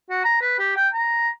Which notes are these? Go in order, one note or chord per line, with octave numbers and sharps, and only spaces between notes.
F#4
A#5
B4
G4
G5
A#5